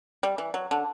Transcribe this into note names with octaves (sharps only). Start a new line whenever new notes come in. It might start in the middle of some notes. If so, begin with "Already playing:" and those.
G3
E3
F#3
D3